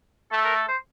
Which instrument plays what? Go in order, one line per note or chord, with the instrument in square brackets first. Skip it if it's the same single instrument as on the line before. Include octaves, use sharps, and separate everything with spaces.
[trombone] A3 [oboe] A4
[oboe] A#4
A4
C5